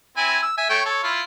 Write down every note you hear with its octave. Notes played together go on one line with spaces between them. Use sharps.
C4 E4 G#5
E6
E5 G#5
A3 C#5 G5
A4 C#5
E4 F4